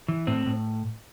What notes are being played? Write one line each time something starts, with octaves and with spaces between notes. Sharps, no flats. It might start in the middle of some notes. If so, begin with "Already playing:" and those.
E3
A2 C4
A2